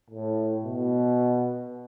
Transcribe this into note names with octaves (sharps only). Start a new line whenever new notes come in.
A2
B2